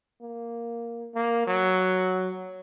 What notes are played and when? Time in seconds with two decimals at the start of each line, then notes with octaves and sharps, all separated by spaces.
0.22 A#3
1.15 A#3
1.47 F#3